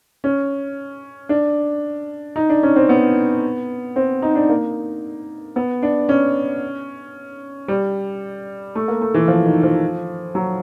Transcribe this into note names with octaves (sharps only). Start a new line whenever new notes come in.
C#4
D4
D#4
D4
C#4
C4
B3
C4
D#4
D4
A#3
B3
D4
C#4
G3
A3
A#3
A3
E3
F3
D#3
F3
F#3